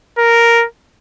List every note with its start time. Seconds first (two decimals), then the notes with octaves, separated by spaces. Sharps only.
0.18 A#4